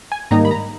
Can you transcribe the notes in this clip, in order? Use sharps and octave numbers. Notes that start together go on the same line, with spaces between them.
G#5
G#2 D#3 G3 A#3 D#4 A#5
B5
A#5